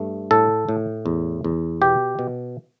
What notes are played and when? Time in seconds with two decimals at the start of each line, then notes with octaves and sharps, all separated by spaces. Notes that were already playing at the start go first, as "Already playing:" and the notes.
Already playing: G2 A3
0.31 A2 A4
0.69 A2
1.06 E2
1.44 E2
1.81 B2 G4
2.19 B2